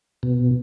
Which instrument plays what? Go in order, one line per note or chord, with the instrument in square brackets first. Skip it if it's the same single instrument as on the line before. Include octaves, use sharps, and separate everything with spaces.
[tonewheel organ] B2